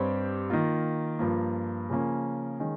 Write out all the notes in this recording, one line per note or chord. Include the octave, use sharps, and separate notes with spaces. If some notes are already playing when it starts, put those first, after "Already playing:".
Already playing: G2 G3 C4 G4 C#5
D#3 A#3 F4
G2 F3 A#3
C#3 F3 A#3 C#4
D#3 G#3 C#4